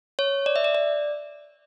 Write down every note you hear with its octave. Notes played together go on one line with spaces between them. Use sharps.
C#5
D5
E5
D5
D5